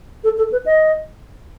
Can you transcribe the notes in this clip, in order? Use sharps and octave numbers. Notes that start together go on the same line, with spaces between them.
A4
A4
B4
D#5